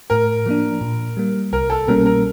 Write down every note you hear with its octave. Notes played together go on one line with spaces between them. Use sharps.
A2 A#4
F3 A#3 D4
A#2
G3 A#3
C2 A#4
A4
B2 G3 A#3 C#4 A#4
A#4